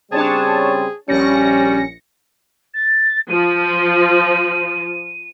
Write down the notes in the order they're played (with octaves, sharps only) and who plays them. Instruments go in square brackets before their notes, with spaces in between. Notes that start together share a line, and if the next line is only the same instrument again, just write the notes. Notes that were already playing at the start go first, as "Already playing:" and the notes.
[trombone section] C#3 G3 C4 [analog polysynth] D4 C#5 A5 [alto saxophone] G#4
[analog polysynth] A#1 A#6 C#7 [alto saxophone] G3 [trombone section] C#4
[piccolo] A6
[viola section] F3 [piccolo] D#7